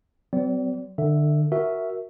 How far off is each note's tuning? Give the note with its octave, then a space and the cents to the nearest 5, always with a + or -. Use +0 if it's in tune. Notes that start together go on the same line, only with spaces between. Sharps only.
F#3 +30 C4 -40 D5 -35
D3 +30 E5 +0
F#4 +0 A#4 +0 E5 -5